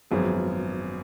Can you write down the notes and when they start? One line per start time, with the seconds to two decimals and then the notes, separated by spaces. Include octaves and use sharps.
0.11 G#1 F#2 F3 B3 G#4